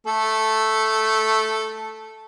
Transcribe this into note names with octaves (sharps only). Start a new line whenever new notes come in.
A3 A4